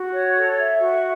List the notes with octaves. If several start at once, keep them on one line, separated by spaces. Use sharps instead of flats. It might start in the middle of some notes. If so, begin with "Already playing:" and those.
Already playing: F#4
C#5
A4
E5
F#4